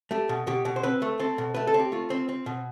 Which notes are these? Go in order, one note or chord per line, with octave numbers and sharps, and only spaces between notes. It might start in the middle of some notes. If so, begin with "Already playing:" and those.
A3 G4
B2
B2 G4
B2
C5
C4 B4
A3
C4 A4
B2
A3 B4
A4
C4
G4
A3 F4
C4
C4
B2